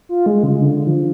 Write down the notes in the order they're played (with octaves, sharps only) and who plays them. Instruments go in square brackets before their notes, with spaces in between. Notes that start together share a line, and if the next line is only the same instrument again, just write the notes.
[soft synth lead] F4
G#3
C#3
D3
F3